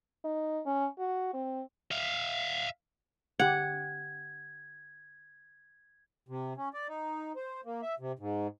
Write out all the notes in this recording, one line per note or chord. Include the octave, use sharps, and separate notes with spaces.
D#4
C#4
F#4
C4
E5 F5
D3 G4 F#5 G#6
C3
C#4
D5
D#4
C5
A#3
E5
C3
G#2